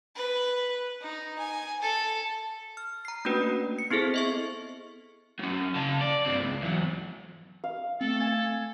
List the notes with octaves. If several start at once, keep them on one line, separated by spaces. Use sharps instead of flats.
B4
D#4
G#5
A4
F6
A#5 C7
A3 A#3 C#4 D4 F#4 B4
C#7
B3 C4 E4 G#4 A4 C5
D#5 E5 C#6
F#3 C#4
C#3 A5
D5
G2 C4
C#2
E2 F#3
F5
A3 C4 A4
G#5 G#6